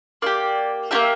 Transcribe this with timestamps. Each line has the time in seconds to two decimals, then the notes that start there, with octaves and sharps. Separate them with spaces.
0.22 A#3 E4 D5
0.26 G4
0.91 A#3 E4 G4 E5